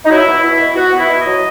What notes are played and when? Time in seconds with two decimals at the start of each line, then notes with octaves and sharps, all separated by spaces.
0.05 D#4
0.10 F#3 E4
0.27 B2
0.43 B2 E4
0.59 B2
0.76 B3 F#4
0.92 B3
0.99 E4
1.10 B2
1.20 D#5
1.25 F#3